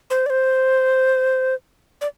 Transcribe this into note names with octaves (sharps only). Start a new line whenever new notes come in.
C5
D5
C5
D5